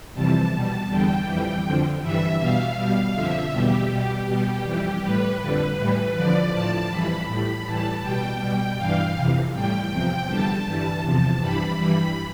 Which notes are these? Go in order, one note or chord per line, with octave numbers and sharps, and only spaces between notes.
F2 C3 E3 G3 A5
B2 G3 A5
E2 D3 G3 G5
F2 E3 G3
F2 D3 F3
G2 E3 G3 E5
B2 G3 F5
B2 G3
F2 D3 F3 E5
E2 B2 G3 G4
B2 G3
B2 G3 G4
F2 E3 G3
A2 G3 B4
F2 D3 G3
A2 E3 G3
F2 D3 F3 D5
A2 F3 A5
F2 E3 G3 B5
A2 G3 B5
A2 E3 G3 A5
B2 G3 G5
B2 G3
G2 E3 G3 F5
F2 C3 E3
A2 G3 G5
E2 C3 F3
E2 D3 G3 A5
G2 E3 G3
E2 C3 F3 A5
G2 E3 G3 B5
G2 E3 G3